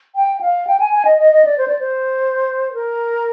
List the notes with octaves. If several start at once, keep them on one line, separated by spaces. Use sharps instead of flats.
G5
F5
G5
G#5
G#5
D#5
D#5
D#5
D5
C5
D5
C5
A#4